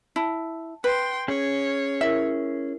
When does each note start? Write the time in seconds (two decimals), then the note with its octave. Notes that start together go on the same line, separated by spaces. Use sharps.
0.16 E4 A5
0.84 B4 G5 C6
1.28 C#4 G#4 C#5
2.01 E4 A#4 E5